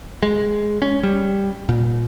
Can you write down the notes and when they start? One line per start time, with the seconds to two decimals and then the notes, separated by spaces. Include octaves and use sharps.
0.23 G#3
0.82 C#4
1.03 G3
1.69 A#2